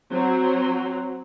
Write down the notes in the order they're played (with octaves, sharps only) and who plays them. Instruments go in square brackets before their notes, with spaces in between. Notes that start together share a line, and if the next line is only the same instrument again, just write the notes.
[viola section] F#3 C4 F#4